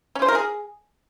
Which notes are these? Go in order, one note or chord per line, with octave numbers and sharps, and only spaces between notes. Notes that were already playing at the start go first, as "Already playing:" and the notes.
C#4
C5
A#4
G#4